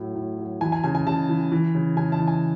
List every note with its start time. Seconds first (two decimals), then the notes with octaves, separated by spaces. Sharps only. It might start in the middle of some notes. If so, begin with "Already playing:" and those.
Already playing: A2 F#3
0.15 A2
0.38 F#3
0.61 E3 G#5
0.72 G#5
0.84 C#3 G#5
0.95 G#5
1.07 C#3 A5
1.29 E3
1.52 E3
1.75 C#3
1.96 C#3 G#5
2.12 A5
2.20 E3
2.28 G#5